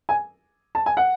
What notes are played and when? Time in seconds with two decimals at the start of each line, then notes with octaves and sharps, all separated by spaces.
0.09 G#5
0.75 A5
0.86 G#5
0.97 F#5